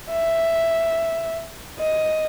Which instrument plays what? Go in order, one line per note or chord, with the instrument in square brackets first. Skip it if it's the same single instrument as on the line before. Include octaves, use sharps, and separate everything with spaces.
[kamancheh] E5
D#5